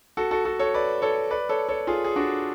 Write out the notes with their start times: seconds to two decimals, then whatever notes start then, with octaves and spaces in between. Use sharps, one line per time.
0.17 F#4 A4
0.31 F#4 A4
0.45 F#4 A4
0.59 A4 C#5
0.74 B4 D5
1.02 A4 C#5
1.31 B4 D5
1.49 A4 C#5
1.69 A4 C#5
1.87 F4 G#4
2.04 G#4
2.16 D4 F#4